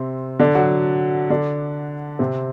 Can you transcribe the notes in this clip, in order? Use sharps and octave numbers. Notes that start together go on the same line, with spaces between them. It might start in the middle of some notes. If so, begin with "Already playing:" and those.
Already playing: C3 C4
D3 D4
F#3 F#4
D3 D4
C3 C4